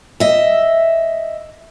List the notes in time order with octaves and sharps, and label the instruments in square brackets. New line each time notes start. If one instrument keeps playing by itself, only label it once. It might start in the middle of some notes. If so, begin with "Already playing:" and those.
[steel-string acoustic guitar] D#5 E5